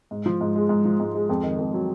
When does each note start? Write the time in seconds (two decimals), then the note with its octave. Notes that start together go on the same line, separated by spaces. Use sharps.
0.11 G#2
0.26 F3
0.41 G#2
0.56 G#3
0.69 G#2
0.85 F3
1.00 G#2
1.15 G#3
1.29 F2
1.43 D#3
1.59 F2
1.74 F#3